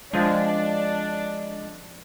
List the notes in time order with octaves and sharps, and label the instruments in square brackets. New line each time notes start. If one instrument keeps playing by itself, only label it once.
[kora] F3 C4 [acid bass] G#3 [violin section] D4